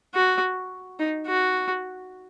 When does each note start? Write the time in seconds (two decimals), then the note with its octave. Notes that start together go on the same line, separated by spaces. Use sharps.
0.14 F#4
0.99 D#4
1.27 F#4